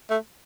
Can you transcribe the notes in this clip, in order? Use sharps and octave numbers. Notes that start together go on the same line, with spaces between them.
A3